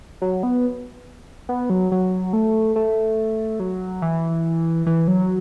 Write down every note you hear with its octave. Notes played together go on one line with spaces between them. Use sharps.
F#3
B3
B3
F#3
F#3
A3
A3
F#3
E3
E3
F#3